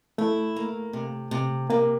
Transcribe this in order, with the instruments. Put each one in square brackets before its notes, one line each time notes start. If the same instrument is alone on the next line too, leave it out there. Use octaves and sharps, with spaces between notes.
[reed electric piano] A3 [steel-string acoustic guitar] E4
[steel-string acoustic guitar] A#3
C3
C3
[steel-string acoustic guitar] C3 [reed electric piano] A#3